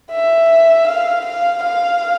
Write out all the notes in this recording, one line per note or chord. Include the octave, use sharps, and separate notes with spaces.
E5
F5
F5
F5